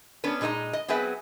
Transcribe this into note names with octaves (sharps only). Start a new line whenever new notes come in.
B3 C#4 D4 B4
A#2 G#3 D#4 C5 A#5
D#5
F#3 B3 C4 G#4 B4 E5